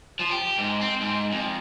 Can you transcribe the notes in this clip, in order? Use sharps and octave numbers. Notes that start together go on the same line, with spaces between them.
F3
G4
G#2
C4
G#2
F2